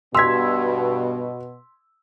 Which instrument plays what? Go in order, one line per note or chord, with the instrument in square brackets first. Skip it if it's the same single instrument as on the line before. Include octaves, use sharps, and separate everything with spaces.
[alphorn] G2 [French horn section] B2 [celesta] C6 B6 [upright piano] E6 G#6